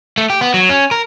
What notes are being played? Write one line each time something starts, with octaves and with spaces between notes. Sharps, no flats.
A3
G4
B3
F#3
C#4
A#4